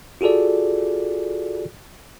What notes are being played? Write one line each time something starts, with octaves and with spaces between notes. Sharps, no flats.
F4 F#4 G#4 A4 D5